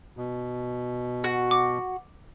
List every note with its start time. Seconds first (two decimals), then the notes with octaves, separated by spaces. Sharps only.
0.17 B2
1.24 F#4
1.51 D6